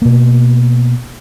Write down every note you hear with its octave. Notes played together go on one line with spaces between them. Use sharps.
B2 A#3